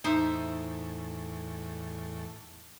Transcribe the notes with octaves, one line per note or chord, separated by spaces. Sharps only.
E2 A2 D#4 C5 E5